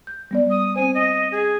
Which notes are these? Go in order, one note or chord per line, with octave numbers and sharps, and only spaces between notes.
G6
G3 B3 D5
D#6
C4 C5 G#5
D#5
G#4